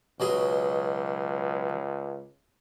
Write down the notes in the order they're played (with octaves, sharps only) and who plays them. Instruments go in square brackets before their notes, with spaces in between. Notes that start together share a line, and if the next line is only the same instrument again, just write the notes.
[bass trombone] C#2 [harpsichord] B2 F#3 G#4